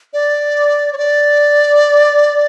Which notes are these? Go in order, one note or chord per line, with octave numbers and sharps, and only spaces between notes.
D5
C#5
D5